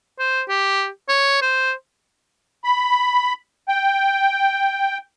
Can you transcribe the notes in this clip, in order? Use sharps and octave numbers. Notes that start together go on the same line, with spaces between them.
C5
G4
C#5
C5
B5
G5